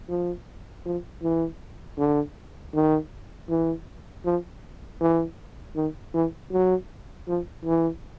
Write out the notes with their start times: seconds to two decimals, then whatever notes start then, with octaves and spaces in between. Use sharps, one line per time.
0.09 F3
0.85 F3
1.22 E3
1.98 D3
2.74 D#3
3.49 E3
4.25 F3
5.01 E3
5.75 D#3
6.14 E3
6.52 F#3
7.28 F3
7.65 E3